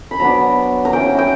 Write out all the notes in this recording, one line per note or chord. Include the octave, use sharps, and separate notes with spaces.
B5
F#3 B3 D4 A#5
A#5
F#3 C#4 E4 G5
G5